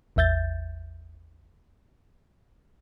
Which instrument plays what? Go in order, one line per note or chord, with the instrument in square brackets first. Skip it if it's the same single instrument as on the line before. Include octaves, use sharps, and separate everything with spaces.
[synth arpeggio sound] A1 E2 E5 G6 A6